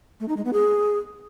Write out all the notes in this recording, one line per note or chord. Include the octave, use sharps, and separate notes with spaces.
A3
D#4
G#3
B3
G#4